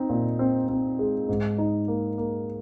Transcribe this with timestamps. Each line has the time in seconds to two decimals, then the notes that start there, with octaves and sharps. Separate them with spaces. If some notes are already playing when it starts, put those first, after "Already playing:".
Already playing: C4 D#4
0.09 A#2
0.39 C4
0.69 C4
0.99 G#3
1.28 G#2
1.58 D#4
1.88 A#3
2.18 A#3